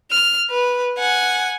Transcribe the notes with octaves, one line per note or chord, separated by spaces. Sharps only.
F6
B4
F#5 G#5